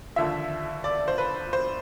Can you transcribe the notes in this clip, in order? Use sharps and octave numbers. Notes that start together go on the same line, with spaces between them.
D#2 D3 F3 E5
D5
C5
B4
C5